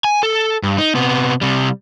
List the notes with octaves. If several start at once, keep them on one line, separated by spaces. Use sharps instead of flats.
G#5
A4
G2
D#4
C3 B3
C3 G3